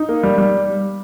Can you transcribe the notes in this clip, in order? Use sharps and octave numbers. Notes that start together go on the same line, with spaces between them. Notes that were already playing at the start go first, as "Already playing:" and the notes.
Already playing: D#4
A#3
G3
G3